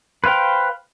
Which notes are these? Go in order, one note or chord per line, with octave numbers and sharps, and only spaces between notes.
B4 C5 F5 G5